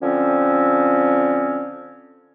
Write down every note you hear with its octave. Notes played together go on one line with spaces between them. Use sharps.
D3 F3 C4 C#4